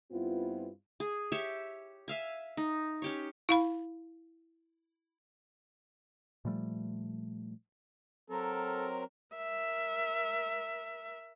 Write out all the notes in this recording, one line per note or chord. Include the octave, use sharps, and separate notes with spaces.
G2 B3 C4 E4 F4
G#4
G4 C#5 E5
E5 F5 G#5
D#4
C#4 G4 C#5
E4 F5 B5
A#2 F3 G3 A3
F#3 C4 A4 A#4
A#4 E5